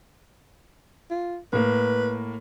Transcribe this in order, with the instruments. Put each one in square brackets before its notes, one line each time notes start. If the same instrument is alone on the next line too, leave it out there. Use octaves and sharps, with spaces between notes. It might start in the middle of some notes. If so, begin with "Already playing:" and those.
[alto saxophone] F4
[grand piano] A2 A#3 [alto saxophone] B4